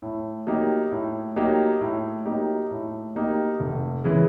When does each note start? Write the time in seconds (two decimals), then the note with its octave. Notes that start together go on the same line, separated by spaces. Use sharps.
0.02 A2
0.47 F#3 A#3 D#4 G4
0.91 A2
1.36 F#3 A#3 D#4 G4
1.81 A2
2.25 F#3 A#3 D#4 G4
2.71 A2
3.15 F#3 A#3 D#4 G4
3.60 F1
4.04 C#3 E3 G#3